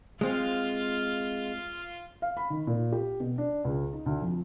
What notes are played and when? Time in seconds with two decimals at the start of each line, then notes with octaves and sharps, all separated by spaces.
0.21 G#3 C4 F4 F5
2.22 F5
2.37 B5
2.50 D#3
2.67 A#2
2.92 G4
3.20 B2
3.38 D4
3.65 C#2
3.93 D#4
4.06 D2
4.22 F2